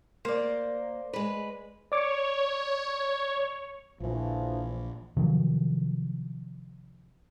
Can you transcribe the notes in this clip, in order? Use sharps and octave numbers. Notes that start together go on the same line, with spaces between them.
A#3 C5 D5
G#3 B4
C#5 D5 D6
A#1 A#2 D3 E3 F3
C3 D#3 F3 F#3